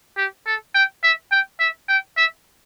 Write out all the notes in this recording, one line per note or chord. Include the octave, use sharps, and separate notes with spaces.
G4
A4
G5
E5
G5
E5
G5
E5